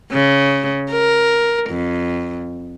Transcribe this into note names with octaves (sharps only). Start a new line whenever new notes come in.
C#3
A#4
F2